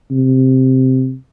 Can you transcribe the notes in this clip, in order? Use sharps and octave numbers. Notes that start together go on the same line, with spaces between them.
C3